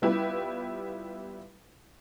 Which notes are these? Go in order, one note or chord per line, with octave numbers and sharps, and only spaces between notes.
G3 B3 E4 F4 G4 B4